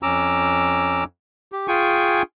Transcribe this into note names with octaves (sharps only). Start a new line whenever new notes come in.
F2 C#4 A#5 D6 E6
G4
F4 G#4 G5 G#5 C#6